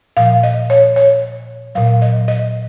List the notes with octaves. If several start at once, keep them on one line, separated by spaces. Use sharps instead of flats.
A#2 F3 F5
D#5
C#5
C#5
A#2 F#3 F5
D#5
D#5